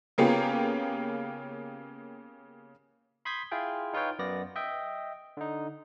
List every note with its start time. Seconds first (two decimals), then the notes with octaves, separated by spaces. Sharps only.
0.18 C#3 A#3 B3 C#4 F4 G4
3.25 B5 C6 D#6 G6 G#6 B6
3.52 E4 F4 G#4 G5
3.93 D#4 F4 B4 C#5 G5
4.19 F#2 B3 D5 A#6
4.56 D#5 E5 G5
5.37 D3 D#4